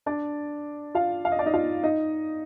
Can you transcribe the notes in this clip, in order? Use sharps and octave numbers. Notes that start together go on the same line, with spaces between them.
D4 D5
F4 F5
F5
D#5
D5
D#4 D#5
F4 F5
D#4 D#5